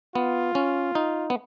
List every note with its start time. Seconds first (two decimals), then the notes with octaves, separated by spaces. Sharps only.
0.15 B3 F4
0.55 C#4
0.95 D#4
1.30 B3